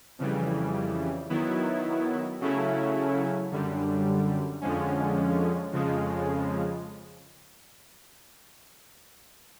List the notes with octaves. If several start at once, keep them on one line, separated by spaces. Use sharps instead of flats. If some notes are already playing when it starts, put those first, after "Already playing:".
F2 C#3 E3 G3
D#3 F#3 B3 E4
C#3 F#3 A3 C#4 E4
F#2 D3 G3
F2 D3 F3 G#3 C#4
F2 C#3 F3 G#3